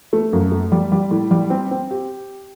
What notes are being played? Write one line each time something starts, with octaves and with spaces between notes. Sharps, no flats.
A3
F#2
A3
G3
G3
A2
G3
C4
C4
G4